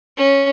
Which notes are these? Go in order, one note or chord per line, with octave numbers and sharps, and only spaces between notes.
C#4